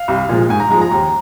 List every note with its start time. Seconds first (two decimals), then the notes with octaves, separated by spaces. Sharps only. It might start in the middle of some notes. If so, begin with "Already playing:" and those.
Already playing: F5
0.08 C2
0.29 A#2 F3 G#3
0.49 G#2 G#5
0.60 A#5
0.70 F3 G#3 A#5
0.81 A#5
0.91 D#2